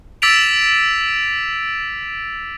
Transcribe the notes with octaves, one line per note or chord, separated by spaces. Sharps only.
D6 E6 A6 B6 D7 F7